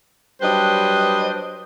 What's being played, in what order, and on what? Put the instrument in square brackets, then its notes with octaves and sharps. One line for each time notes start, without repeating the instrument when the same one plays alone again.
[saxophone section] F#3 G3 D4 B4 C5 D#5